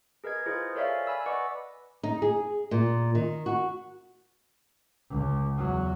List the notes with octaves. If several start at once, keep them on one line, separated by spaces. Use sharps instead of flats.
G#4 A#4 B4 D#5 G#6
E4 F4 G#4 C5 D#5
A4 A#4 C#5 D5 E5 F5
G#5
G#5 B5 E6
B4 D5 D#5 F#5 C#6 D6
D#4
G#4
A#2
D#3
F#4
C#2
E2 F#3